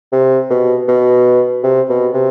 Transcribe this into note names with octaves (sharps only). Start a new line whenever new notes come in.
C3
B2
B2
C3
B2
C3